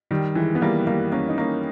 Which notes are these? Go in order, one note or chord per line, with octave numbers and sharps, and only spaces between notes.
D#3 G3
E3 G#3
B3
G3 A#3
G3 A#3
A#3 C#4
D#4
A#3 C#4